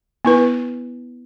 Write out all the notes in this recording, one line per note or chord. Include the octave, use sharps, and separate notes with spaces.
B3 E4 B4